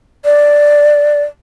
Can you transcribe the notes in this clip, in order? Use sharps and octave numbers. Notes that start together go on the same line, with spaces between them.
D5